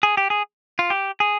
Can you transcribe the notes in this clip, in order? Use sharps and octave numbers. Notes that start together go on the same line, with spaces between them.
G#4
G4
G#4
F4
G4
G#4